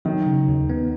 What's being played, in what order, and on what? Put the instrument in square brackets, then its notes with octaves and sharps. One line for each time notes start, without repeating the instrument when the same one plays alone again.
[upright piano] D#3 [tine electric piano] F#3
[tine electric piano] C#3
D#2
B3